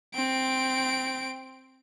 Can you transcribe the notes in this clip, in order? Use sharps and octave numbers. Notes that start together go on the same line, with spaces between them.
C4 D7